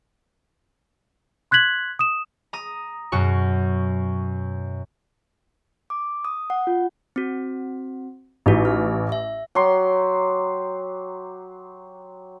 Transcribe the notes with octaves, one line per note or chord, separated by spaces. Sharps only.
C6 F#6 G#6 B6 F#7
D#6 E7
A#5 D#6
F#2 B2 F#4 C#6
D6
D#6
F#5
F4
C4 F#4
A1 D#4 E4 F#4
F6
E5
F#3 G4 C6